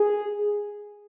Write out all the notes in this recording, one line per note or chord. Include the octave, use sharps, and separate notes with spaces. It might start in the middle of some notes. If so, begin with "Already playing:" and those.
Already playing: G#4